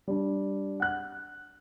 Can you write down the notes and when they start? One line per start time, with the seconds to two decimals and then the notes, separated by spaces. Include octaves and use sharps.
0.08 G3 D4
0.80 F#5 F#6